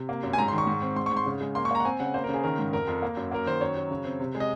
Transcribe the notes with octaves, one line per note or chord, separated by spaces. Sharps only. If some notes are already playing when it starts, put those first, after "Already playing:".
Already playing: C3
A#3
F#2
G#5
G#2 A#5
C6
D#3
C#6
G#2
C4
G#2 C6
C#6
G#2
C6
C#3
G#3
A#3 C6
C#6
A#3 A#5
F#5
C4 G#5
C#3 F#5
A#3 C5
A#4
C#3
G#4
D#3 A#4
G#2
F2 A#4
F2
A#3
F#2
A#3 A#4
D#3 C5
F#2 C#5
F#3
C#3
C4
C3
G#3
D#5